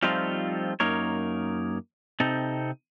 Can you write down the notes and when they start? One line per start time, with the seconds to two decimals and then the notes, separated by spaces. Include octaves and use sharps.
0.03 F3 G3 A3 C4 D#4 F4
0.80 F#2 A#3 D#4 A#4 C#5
2.20 C3 C4 D#4 A4